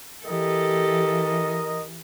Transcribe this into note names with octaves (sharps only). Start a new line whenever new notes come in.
E3 G4 A4 A#4 D#5